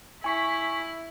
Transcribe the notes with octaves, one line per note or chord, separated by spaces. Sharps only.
E4 G#5 C#6 B6